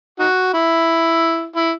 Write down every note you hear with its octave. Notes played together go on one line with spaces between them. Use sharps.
D#4 F#4
E4
E4